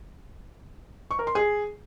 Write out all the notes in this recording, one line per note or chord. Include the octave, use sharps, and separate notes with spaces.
C#6
A#4
C6
G#4